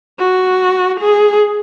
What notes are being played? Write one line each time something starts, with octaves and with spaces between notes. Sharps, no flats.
F#4
G#4